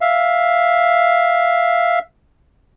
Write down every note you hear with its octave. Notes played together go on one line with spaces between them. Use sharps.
E5 F5